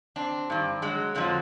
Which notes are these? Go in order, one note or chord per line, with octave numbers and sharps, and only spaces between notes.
C4 D4
G2 D#3
F#3 G#3
F2 D3 F3 F#3